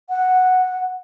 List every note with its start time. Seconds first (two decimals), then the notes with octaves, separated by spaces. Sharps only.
0.09 F#5